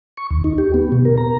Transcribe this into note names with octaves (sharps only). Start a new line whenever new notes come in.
C#6
D#2
D#4
G4
B3
B2
A#4
A#5